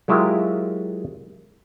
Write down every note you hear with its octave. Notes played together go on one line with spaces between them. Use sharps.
F#3 G#3 E4 F4 G4 A#4